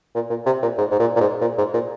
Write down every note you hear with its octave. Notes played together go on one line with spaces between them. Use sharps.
A#2
A#2
C3
A#2
G#2
G#2
A#2
A#2
G#2
A#2
G#2
A#2